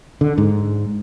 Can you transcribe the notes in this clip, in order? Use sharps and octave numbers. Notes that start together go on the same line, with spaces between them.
D3
G#2